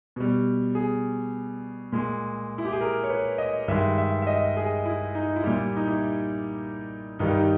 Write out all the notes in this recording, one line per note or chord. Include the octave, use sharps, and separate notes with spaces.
B2 G3
G#4
A#2 G#3
E4
G4
G#4
A#4
C#5
B4
D#5
G2 D#3 G#3 E5
E5
E5
D#5
G#4
E4
D#4
E4
A#2 G3 G4
D#4
E4
G2 D#3 G3 D#4
D#4